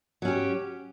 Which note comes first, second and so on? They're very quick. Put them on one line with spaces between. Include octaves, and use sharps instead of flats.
F#3 C#4 G4